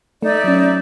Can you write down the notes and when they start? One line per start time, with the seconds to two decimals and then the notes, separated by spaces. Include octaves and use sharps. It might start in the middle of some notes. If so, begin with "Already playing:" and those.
0.22 A3 D#4 D5 E5
0.44 F#3 C#4